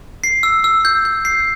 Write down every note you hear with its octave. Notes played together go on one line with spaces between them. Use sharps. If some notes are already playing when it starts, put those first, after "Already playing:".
C7
E6
E6
G6
G6
C7